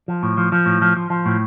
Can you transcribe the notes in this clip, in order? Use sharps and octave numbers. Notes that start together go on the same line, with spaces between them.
F3
A2
F3
F3
A2
F3
F3
F3
A2